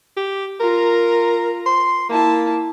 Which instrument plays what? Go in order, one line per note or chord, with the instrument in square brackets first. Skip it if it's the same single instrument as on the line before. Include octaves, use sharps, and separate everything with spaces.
[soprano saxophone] G4
[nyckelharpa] F4 A#5 [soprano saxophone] A#4
[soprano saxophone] C6
[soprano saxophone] A#3 [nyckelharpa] E4 A5